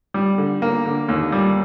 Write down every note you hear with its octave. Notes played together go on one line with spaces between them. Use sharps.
G3
D3
A#3
D3
D#2
G3